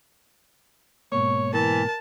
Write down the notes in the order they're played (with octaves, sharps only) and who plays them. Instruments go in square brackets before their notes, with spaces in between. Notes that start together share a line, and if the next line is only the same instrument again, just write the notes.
[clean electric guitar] G#2 B2 A#3 [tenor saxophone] C#5 [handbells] C#6
[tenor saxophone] E3 [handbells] A#4 [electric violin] A5